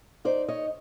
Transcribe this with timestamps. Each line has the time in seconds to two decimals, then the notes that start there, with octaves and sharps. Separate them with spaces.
0.25 D#4 C5 D5
0.48 C#5 D#5